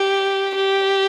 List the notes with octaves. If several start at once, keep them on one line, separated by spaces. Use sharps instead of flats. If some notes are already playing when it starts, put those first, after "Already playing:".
Already playing: G4
G4